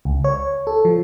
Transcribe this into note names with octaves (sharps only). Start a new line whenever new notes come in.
C#2
C#5
A4
F3